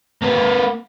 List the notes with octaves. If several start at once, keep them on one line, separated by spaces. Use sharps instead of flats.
A#3 B4